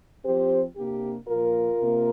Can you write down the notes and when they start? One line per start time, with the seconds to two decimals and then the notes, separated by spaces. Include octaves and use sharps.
0.25 F3 C4 G4 C5
0.77 C3 A#3 D4 G4
1.28 A#2 F3 A#3 F4 A#4
1.80 C3 A#3